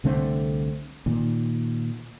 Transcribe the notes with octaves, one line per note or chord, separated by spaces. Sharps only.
C2 D3 A3 C4
A#2 D#3